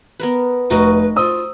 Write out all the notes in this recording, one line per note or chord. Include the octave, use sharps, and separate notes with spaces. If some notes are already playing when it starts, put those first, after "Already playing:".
B3 A#4 B4
F1 F#4 A#4 B4 D#5
F4 C5 D#6 E6